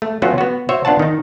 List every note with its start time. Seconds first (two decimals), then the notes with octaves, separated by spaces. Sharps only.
0.02 A3
0.22 F#3 A3 B3 C#4 F4 F#4
0.38 B3 F#4
0.69 F#4 C5 C#5 E5
0.85 B3 D4 F4 F#5 A5
0.99 D#3 D#4